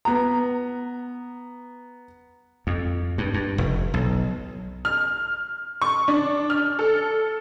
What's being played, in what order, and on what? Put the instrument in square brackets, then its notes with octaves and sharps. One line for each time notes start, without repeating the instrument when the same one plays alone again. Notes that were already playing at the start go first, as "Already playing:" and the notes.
[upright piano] B3 A#5
[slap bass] F2
G2
G2
F1
B1
[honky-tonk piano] F6
C#6
D4
F6
A4